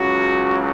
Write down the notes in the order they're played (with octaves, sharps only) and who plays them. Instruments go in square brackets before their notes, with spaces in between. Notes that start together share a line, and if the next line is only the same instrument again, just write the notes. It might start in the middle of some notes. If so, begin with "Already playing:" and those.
Already playing: [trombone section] C#2 C#3 F#3 F#4